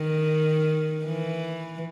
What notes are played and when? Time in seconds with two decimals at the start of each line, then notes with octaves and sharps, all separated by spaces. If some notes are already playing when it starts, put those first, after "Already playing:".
Already playing: D#3
1.05 E3